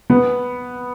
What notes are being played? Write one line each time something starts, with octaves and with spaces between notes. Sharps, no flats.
B3